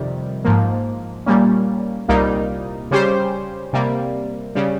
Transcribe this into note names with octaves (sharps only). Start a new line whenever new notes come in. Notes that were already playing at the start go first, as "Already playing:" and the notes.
Already playing: F2 C3 D#3 G3
G#2 F3 A#3
A#2 G3 A#3 C#4
C2 A#2 G3 A#3 D#4
C#3 G3 C#4 G4 C5
C3 G3 A#3
C#3 G3